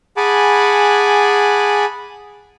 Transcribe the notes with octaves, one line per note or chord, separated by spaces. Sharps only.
G#4 F#5 G#5 A5 B5 D6